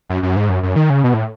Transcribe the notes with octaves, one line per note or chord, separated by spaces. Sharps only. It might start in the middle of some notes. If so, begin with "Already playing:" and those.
F#2
F#2
G#2
F#2
F#2
D#3
C#3
B2
A2